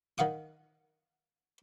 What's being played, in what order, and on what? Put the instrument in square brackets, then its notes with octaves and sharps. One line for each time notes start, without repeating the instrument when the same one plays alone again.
[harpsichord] D#3 F5 F#5 D#6